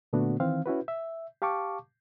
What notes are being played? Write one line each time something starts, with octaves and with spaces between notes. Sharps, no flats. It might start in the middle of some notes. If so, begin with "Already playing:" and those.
A#2 D3 A3 B3 D4 F#4
D#3 E3 C4 F5
C#4 E4 F#4 B4
E5
G4 F5 A5 C#6 D6